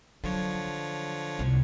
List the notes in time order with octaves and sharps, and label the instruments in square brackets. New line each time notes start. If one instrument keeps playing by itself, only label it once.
[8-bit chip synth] D3 F3 C#5 [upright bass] F#3
[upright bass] C2